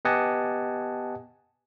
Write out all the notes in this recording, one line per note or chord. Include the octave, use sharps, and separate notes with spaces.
B3 G4 D#5 F#5 G#5 A5